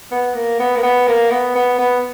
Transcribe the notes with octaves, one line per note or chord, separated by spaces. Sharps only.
B3
A#3
B3
A#3
B3
A#3
B3
B3
B3